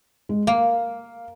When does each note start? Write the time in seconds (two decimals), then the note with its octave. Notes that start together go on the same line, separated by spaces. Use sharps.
0.29 G#3
0.47 A#3 F5